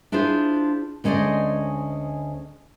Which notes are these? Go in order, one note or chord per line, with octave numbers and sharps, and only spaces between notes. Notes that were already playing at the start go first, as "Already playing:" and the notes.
D4 E4 F4 G#4 C5
D2 G#3 C#4 C5 D5 D#5